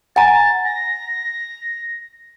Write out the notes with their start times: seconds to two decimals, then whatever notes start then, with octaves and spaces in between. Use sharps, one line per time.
0.16 F#5 G#5 A#5 A6
0.65 A#6